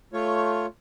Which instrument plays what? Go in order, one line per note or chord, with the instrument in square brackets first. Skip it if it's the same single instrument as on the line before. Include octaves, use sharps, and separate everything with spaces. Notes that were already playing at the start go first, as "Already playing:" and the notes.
[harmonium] A3 F4 C#5